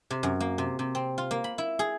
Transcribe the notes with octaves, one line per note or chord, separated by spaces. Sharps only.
C3
F#2
A#3
C3
C3
C4
F4
A#3
B5
E4
G#4